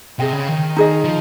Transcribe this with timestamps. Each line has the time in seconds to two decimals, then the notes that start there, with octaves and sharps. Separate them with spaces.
0.19 C3 G#4 D#5 G5
0.33 C#3
0.48 D#3
0.76 D#4 G#4 D#5
1.04 F3